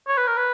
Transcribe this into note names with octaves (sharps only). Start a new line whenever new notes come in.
C#5
B4
A#4
B4